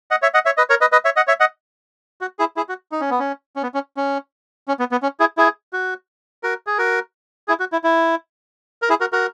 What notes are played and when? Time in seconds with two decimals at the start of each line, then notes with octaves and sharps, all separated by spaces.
0.11 D#5 F#5
0.22 C#5 E5
0.34 D#5 F#5
0.45 C#5 E5
0.57 B4 D#5
0.69 A#4 C#5
0.81 B4 D#5
0.92 B4 D#5
1.05 C#5 E5
1.16 D#5 F#5
1.27 C#5 E5
1.40 D#5 F#5
2.21 F#4
2.39 E4 G#4
2.56 E4 G#4
2.69 F#4
2.92 D#4
3.01 C#4
3.10 B3
3.19 C#4
3.56 C#4
3.63 B3
3.74 C#4
3.97 C#4
4.68 C#4
4.79 B3
4.92 B3
5.02 C#4
5.20 E4 G#4
5.37 E4 G#4
5.73 F#4
6.43 F#4 A#4
6.67 G#4
6.78 F#4 A#4
7.48 E4 G#4
7.60 F#4
7.72 E4
7.84 E4
8.82 A#4
8.89 E4 G#4
9.01 F#4 A#4
9.13 F#4 A#4